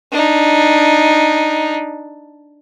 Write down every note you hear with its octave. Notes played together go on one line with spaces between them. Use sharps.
D4 D#4